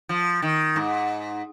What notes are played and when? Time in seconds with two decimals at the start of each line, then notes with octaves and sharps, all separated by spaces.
0.09 F3
0.42 D#3
0.76 G#2